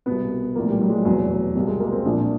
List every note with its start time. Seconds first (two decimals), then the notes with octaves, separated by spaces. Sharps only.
0.06 C2 B2 B3
0.55 A#1 A2 F3 A#3
0.69 G3
0.81 F#3
0.89 G#3
0.93 G3
1.05 F1 E2 B2 F#3
1.55 C2 B2 G3
1.68 G#3
1.80 A#3
1.92 C4
2.05 A#1 A#2 F3 D4